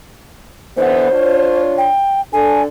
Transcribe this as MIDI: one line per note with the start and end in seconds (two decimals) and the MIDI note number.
0.77 1.06 50
0.77 1.06 52
0.77 1.06 59
0.77 1.61 72
1.11 1.88 62
1.11 1.88 65
1.11 1.88 73
1.78 2.21 79
2.33 2.65 50
2.33 2.65 62
2.33 2.65 69
2.33 2.62 80